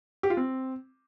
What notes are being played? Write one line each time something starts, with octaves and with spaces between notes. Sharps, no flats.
G4
F4
C4